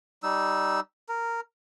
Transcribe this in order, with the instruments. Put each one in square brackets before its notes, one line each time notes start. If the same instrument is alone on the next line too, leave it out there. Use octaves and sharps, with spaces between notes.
[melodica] G3 D#4 E6
A#4